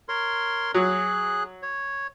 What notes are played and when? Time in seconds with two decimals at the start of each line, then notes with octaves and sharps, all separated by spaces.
0.09 A#4 C#5 C6
0.74 F#3 G#4 F#6
1.62 C#5